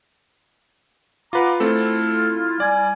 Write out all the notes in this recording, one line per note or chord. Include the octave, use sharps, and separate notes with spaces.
F4 B4 F#5 A#5 D6
A3 C4 E4 F4 A4
G3 D5 G#5